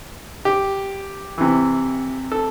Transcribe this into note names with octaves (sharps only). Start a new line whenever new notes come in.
G4
C3 E3
A4